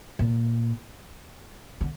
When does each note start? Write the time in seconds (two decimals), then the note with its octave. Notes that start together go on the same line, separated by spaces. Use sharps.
0.19 A#2
1.81 D3